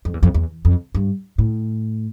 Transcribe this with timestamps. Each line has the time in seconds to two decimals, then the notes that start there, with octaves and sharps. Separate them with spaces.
0.05 F2
0.14 E2
0.23 F2
0.34 E2
0.65 F2
0.95 G2
1.38 A2